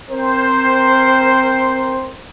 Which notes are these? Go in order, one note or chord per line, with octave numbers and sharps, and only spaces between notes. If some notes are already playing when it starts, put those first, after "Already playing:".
C4 A#4 C5